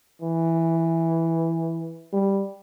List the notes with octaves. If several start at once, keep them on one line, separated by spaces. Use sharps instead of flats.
E3
G3